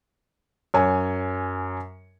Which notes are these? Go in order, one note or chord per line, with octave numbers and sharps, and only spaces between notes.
F#2 C#5 G#5